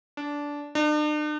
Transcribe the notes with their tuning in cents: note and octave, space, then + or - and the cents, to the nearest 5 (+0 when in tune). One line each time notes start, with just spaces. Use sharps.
D4 -15
D4 +45